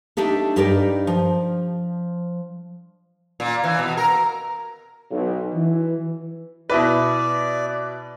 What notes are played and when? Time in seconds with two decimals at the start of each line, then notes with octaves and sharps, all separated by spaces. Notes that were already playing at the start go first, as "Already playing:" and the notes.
0.17 A3 D4 D#4 G4 A4
0.56 G2 D#4 G4 A#4 D5 G5
1.07 F3
3.40 A#2
3.64 E3
3.79 B2
3.97 A#4
5.11 B1
5.53 E3
6.70 B2 E4 B4 D5